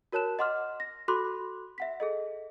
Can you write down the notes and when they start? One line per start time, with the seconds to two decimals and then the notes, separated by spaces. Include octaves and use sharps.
0.12 F#4 A#4 C#5 A5 F#6 E7
0.39 D#5 F#5 C6 D6 F6
0.80 A#6
1.08 F#4 A4 B5 C6 D6 F#6
1.78 E5 F#5 B6
2.00 G#4 A4 D#5